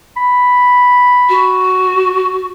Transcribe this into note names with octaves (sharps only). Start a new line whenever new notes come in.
B5
F#4